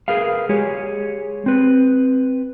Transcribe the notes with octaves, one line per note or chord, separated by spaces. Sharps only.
G#4 A#4 B4 F5
G#3 G4 G#4 C#5
C4 B4